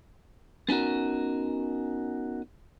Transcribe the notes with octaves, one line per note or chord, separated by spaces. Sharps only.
B3 C#4 D#4 F#4 A#4